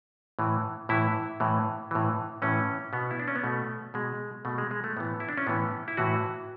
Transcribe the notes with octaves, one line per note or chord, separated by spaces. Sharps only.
A2 E3
A2 E3 E4
A2 E3
A2 E3
A2 E3 C#4
B2 B3
E4
D4
C#4
B3
B2 A3
B2 G#3
B2 A3
G#3
G#3
A3
A2 E3 B3
E4
D4
C#4
A2 E3 B3
E4
A2 E3 F#4